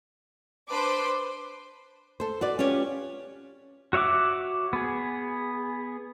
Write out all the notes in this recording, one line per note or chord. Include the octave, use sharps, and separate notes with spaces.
D4 B4 C5 C6 D6
A4 C5
F#4 B4 D5
C#4 F4 G4 C#5
F#4 C#5 E5 F#5 D6
B3 G#4